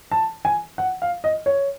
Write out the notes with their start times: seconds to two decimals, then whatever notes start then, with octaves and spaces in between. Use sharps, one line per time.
0.12 A5
0.45 G#5
0.78 F#5
1.02 F5
1.24 D#5
1.46 C#5